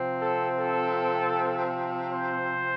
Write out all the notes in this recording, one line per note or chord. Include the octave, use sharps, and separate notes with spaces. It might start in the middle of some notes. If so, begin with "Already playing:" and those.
Already playing: C3 F3 C4
A4
A4
C5